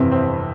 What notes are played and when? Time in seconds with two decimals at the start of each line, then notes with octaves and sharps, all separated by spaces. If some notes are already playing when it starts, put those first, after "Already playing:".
Already playing: G1 F2 C3 E3 C4
0.11 C4